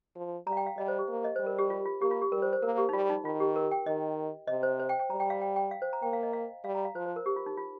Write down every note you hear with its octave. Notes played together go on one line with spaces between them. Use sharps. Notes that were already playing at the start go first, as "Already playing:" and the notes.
F3
G3 A#5
F5
G5
F5
G3 D#5
C5
G4
A#3
D#5
G3 C5
A#4
G4
F4
F4
A#3 G4
F4
G4
G3 A#4
C5
C5
A#3 A#4
G4
D#4
G3 F4
D#4
D#3 F4
G4
A#4
G5
D#3 D#5
C3 D#5
C5
C5
G5
G5
G3 A#5
G5
F5
G5
G5
F5
C5
A#5
A#3 G5
F5
D#5
F5
G3 F5
A#5
F5
F3 C5
C5
A#4
G4
F4
D#4
F4